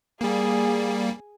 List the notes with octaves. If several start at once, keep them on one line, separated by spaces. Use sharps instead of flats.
G3 A#3 G#4